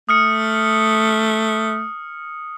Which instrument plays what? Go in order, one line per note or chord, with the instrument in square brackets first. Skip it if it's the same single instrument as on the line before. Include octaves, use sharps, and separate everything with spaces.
[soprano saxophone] A3 [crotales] D#6 F6 C#7